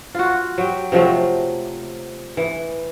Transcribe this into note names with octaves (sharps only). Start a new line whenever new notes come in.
F4 F#4
F#3 G4
C3 F3 F#3 A3
E3